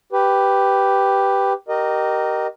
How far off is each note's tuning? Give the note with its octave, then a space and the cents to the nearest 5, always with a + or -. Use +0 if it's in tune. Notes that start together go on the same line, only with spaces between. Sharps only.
G4 +0 B4 +0
G4 -25 A#4 +0 D#5 -15